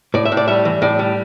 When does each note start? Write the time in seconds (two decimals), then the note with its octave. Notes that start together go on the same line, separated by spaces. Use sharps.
0.14 A2 D5
0.25 E5
0.32 A2
0.37 D5
0.48 G3 E5
0.65 E3
0.82 A2 D5
0.99 G3